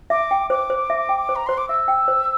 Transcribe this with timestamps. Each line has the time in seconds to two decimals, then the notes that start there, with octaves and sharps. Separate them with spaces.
0.10 E5 D6
0.31 G5
0.50 C5 D6
0.70 C5
0.90 E5
1.09 G5
1.29 C5
1.36 A#5
1.46 C5 C6
1.58 D6
1.69 E5 E6
1.88 G5
2.08 C5